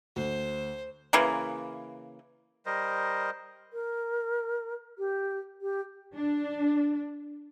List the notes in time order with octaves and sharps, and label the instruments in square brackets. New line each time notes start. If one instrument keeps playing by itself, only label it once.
[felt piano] D2 [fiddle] C5
[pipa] C#3 E3 A#3
[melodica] G3 A#4 C5 D#5
[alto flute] A#4
G4
G4
[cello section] D4